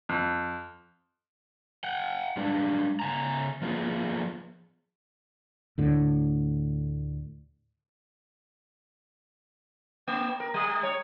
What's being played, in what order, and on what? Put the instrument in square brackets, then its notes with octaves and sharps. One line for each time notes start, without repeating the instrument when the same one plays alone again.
[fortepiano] F2
[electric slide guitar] F#5 G5
G3 G#3 D4
C#3 G#5 A#5
F3 A#3 B3 F4 G#4
[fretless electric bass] D2 A2 D3
[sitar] A#3
A#4
G3
C#5